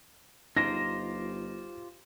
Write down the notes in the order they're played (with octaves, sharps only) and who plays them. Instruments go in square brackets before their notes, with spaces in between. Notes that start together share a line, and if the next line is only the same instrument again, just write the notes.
[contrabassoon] G1 [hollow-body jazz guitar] D#4 [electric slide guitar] F4 G4 C5 [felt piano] A#6